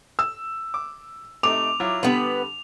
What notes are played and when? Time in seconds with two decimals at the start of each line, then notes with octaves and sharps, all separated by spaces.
0.19 E6
0.74 D6
1.43 C3 A3 D#4 D6 F7
1.80 F#3 E4 F4
2.03 D3 G3 B3 B4